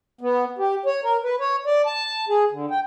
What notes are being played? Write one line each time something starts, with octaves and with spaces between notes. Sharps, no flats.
B3
G4
C#5
A#4
B4
C#5
D5
A5
G#4
D3
G5